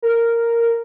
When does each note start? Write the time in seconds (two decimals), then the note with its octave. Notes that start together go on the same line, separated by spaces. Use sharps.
0.02 A#4